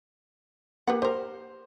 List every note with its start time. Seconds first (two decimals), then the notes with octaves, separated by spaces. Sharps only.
0.87 A#3 G4 B4 F#5
1.02 G4 A#4 C5